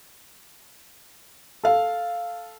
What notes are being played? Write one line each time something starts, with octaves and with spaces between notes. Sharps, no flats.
A4 F5